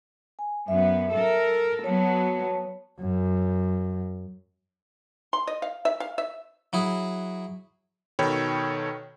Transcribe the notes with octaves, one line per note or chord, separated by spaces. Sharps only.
G#5
F#2 B3 E5
A4 A#4
F#3 B3 C#5 A5
F#2
C6
D#5
F5
E5
F5
E5
F#3 E4 G#4
B2 D#3 A4 C#5 G5 B5